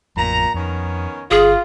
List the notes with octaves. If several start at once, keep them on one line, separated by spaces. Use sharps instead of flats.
A1 F2 A#2 A#5
F2 D#3 B3 C#4
G1 F4 G#4